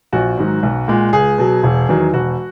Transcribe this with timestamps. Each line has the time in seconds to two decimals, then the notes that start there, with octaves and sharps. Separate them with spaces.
0.13 A#1 F#4
0.38 G#2 D#3 F#3
0.63 B1
0.88 A#2 G#3
1.13 C#2 G#4
1.38 B2 F#3
1.63 E1
1.89 E2 D#3 F#3
2.13 E1 F#4